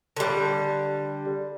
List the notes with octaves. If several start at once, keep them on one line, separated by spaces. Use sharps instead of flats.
D3 G3